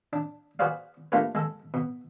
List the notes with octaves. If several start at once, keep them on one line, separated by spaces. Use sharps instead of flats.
D4
F#4 G#4 B4 C5 D5 F5
A3 A#3 D4 F4 G4 B4
G#3 A4
B2